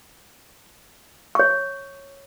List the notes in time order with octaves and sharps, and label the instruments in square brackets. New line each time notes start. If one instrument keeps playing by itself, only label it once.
[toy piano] C#5 C#6